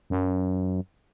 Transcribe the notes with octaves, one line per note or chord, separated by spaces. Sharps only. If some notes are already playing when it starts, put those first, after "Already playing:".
F#2